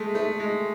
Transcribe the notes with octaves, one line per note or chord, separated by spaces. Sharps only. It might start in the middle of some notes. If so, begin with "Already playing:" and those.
Already playing: G#3 A3
A3
G#3